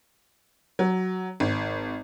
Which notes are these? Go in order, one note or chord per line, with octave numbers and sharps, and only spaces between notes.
F#3
G#1